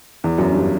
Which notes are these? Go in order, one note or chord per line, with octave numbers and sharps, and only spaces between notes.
E2
F#2
G2